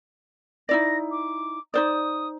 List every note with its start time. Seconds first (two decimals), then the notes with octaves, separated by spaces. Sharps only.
0.69 D#4 E4 D5 A#6
1.11 D6
1.74 D#4 C5 D5 D#6